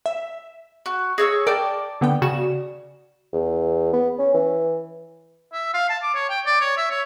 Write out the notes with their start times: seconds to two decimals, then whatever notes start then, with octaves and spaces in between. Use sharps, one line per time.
0.06 E5
0.86 F#4
1.18 G#4 C#5 E6 A#6
1.47 A#4 D5 G5 A5
2.01 D3 B3 G5
2.22 C#3 F#4 E7
3.33 E2
3.93 B3
4.19 C#4
4.34 E3
5.53 E5
5.74 F5
5.90 A5
6.03 D6
6.14 C#5
6.29 G5
6.46 D5
6.61 C#5
6.77 E5
6.91 C#5